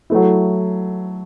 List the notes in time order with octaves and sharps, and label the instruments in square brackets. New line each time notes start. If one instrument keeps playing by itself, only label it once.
[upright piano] F#3 A3 E4